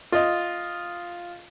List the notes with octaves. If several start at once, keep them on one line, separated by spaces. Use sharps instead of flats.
F4 D#5